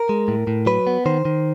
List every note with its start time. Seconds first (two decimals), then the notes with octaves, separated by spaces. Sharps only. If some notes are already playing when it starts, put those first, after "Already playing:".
Already playing: A#4
0.09 G#3
0.28 A2
0.47 A2
0.66 F#3 B4
0.87 B3
1.06 D#3 C5
1.25 D#3